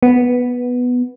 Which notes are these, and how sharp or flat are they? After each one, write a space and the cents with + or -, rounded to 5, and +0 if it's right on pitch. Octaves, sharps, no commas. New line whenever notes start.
B3 +0